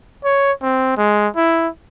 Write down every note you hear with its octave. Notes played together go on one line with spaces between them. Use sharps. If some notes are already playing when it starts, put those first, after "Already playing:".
C#5
C4
G#3
E4